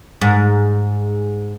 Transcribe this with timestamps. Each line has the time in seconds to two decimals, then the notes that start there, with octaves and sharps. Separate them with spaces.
0.21 G#2